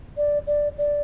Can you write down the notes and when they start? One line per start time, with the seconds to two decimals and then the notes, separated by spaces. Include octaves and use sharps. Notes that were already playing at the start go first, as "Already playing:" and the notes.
0.17 D5
0.47 D5
0.78 D5